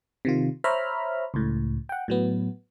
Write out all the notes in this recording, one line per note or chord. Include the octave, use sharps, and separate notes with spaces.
C3 D#3 F4
C5 C#5 E5 A#5 B5 F6
C#2 A2
F#5 G5
A2 F#3 B3